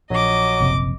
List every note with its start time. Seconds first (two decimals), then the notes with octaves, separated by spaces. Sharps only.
0.10 A#1 F#3 D#5 D6
0.60 F#1 C3